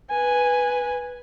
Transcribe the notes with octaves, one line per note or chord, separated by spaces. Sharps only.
B4 G#5